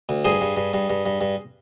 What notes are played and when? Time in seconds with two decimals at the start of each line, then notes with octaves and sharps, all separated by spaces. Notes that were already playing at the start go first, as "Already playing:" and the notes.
0.09 D2
0.25 G2 G#4 C5
0.41 G2
0.57 G2
0.73 G2
0.90 G2
1.06 G2
1.21 G2